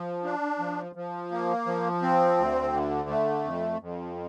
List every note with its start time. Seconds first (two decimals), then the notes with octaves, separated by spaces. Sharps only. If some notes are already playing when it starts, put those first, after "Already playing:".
Already playing: F3
0.24 D4
0.59 F3
0.95 F3
1.31 A#3
1.66 F3
2.02 C4
2.37 D2
2.73 D3
3.09 A3
3.44 F2
3.80 F2